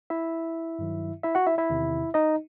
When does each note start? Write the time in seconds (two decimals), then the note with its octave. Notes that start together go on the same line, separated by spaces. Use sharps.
0.10 E4 E5
0.79 G2 D#3 F#3
1.24 E4 E5
1.35 F#4 F#5
1.47 E4 E5
1.58 E4 E5
1.70 E2 C3 D#3
2.14 D#4 D#5